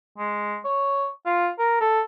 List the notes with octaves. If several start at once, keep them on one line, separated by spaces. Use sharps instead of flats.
G#3
C#5
F4
A#4
A4